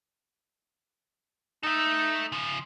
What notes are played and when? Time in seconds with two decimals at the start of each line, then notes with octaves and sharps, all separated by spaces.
1.63 D#4 A4 E5
2.32 C#3 F3